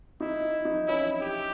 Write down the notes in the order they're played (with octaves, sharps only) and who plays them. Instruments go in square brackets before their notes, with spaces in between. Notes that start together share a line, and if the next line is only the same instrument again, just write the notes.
[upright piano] D#4 [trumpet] E4
[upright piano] D#4
[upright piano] C#4 [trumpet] E4
[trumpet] G4